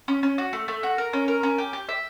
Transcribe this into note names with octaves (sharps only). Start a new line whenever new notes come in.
C#4
C#4
F#4
A3
A3
F#4
A#4
C#4
A#4
C#4
G4
G4
E5